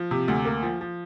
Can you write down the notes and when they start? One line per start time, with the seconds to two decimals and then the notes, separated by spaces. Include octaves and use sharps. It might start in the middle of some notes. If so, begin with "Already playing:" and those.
Already playing: F3
0.11 C3
0.28 D2
0.45 A#3
0.63 F3
0.81 F3